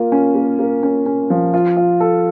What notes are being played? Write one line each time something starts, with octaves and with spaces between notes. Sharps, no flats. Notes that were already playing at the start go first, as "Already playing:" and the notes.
Already playing: A#3 F4
C#4
A#3
A#3
C#4
C#4
F3
F4
F4
A4